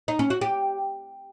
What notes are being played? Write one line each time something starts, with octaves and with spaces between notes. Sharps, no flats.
D#4
C#4
F#4
G4